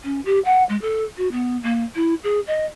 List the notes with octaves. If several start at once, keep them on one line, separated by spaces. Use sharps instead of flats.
C#4
G4
F#5
G#3
A4
F#4
B3
A#3
E4
G#4
D#5